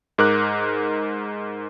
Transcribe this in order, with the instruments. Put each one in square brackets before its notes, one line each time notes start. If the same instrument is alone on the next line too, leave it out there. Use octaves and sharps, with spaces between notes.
[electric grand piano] G#2 A#4 D6 F#6